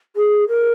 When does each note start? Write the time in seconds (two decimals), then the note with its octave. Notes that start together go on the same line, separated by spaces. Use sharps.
0.16 G#4
0.48 A#4